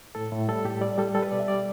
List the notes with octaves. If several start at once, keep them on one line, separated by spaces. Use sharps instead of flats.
A2 A4
A2
G3 A4
A2 G4
G3 D5
G3 A4
G3 A4
B4
B2 D5
E5
G3 D5